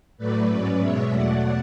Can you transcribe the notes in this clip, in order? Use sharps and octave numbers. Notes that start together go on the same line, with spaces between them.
A2 F#3 A3 B4 D5
G#2 F#3 C#4
B2 G#3 B3 C#5 E5
E2 B2 F#3 A3 D5 F#5